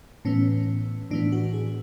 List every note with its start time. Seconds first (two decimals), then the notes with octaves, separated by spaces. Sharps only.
0.25 A2 E3 B3 C#4
1.11 A2 E3 B3 D4
1.32 F#4
1.53 G#4